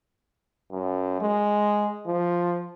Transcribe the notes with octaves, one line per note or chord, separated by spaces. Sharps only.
F#2
G#3
F3